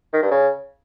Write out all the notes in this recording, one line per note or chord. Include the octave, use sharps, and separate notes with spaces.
D#3
G2
C#3